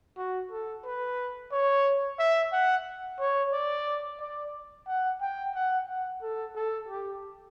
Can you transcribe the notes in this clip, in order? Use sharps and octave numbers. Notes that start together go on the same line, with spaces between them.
F#4
A4
B4
C#5
E5
F#5
C#5
D5
D5
F#5
G5
F#5
F#5
A4
A4
G4